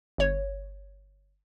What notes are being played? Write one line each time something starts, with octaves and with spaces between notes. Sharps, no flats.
G1 C#5